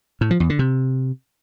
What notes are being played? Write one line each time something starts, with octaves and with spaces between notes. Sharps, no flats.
A2
F3
E2
D3
C3